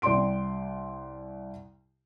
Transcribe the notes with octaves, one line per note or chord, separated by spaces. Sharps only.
C2 D5 G5 C6 D7